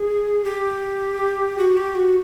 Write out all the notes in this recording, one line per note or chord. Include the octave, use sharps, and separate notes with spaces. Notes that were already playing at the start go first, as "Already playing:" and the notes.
Already playing: G#4
G4
F#4
G4
F#4